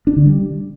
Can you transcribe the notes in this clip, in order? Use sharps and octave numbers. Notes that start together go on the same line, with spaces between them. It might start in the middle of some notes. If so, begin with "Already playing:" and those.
D4
D3
G3